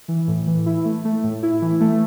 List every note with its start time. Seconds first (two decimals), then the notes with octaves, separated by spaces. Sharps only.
0.08 E3
0.28 A2
0.47 E3
0.66 E4
0.85 A3
1.05 A3
1.24 A2
1.43 E4
1.62 E3
1.81 A3